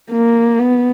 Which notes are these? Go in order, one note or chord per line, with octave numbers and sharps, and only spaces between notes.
A#3
B3